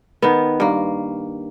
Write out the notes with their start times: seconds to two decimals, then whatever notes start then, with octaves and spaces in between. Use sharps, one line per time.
0.22 D#3 B3
0.60 G2 A#3